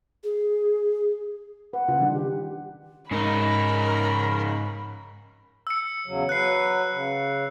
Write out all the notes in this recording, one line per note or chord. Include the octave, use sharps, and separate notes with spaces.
G#4
B4 F#5
C#3 F4
D#3 G3 D4
G4
G#2 C#3 D#4 A#4 B5
E6 C#7
E2 C#3 F#3
F#3 B4 F#6 C7
C#3